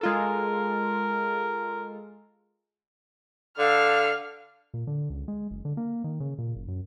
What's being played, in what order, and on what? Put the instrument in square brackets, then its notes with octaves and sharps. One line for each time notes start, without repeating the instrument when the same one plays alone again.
[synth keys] G#3 F4 A4 [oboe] A#4
[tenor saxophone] D3 [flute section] A4 F5 [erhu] F6
[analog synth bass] A#2
D3
C#2
G#3
F#1
D3
A#3
D#3
C#3
A#2
F#1
F#2